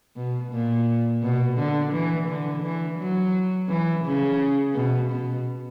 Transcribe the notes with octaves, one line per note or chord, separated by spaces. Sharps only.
B2
A#2
B2
D3
E3
D3
E3
F#3
E3
C#3
B2
B2